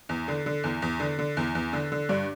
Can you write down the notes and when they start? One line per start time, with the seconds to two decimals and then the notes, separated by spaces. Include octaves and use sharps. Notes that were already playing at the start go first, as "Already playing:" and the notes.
0.09 E2
0.28 D3
0.46 D3
0.64 E2
0.82 E2
1.00 D3
1.19 D3
1.37 E2
1.55 E2
1.73 D3
1.92 D3
2.09 G2 D4